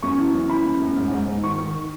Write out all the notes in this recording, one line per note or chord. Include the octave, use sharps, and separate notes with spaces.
F#2 C#6
E3
F#2
E3 B5
F#2
F#2
G#2
G#2
G#2
D#3 C#6
D#3